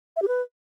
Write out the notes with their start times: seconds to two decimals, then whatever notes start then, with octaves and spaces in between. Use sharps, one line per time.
0.16 E5
0.22 G4
0.28 B4